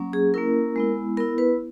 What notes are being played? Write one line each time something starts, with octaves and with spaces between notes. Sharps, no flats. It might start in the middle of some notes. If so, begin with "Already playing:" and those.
Already playing: F#3 A#3 C#4
G#4
A#3 C#4 E4 A#4
G#3 B3 E4
B3 E4 A#4
B4